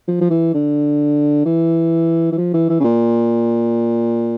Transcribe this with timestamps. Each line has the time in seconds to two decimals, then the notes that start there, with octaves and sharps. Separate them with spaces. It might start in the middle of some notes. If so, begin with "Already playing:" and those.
0.08 F3
0.21 F3
0.30 E3
0.54 D3
1.45 E3
2.32 E3
2.38 F3
2.54 E3
2.69 E3
2.80 C#3
2.84 A#2